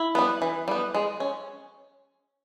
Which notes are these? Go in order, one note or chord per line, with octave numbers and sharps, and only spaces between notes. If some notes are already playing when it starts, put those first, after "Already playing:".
Already playing: E4
G3 B3
E3
G3 B3
G#3
C#4